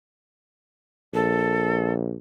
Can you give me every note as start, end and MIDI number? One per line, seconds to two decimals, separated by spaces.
1.14 2.19 34
1.14 1.93 69